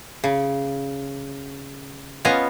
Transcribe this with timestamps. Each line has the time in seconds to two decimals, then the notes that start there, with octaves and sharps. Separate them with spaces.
0.24 C#3
2.25 B3 C#4 F4 C#5 D#5 G#5